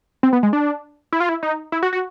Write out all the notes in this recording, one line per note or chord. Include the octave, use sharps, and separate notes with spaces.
C4
B3
G#3
D4
E4
F4
E4
D#4
E4
F#4
F#4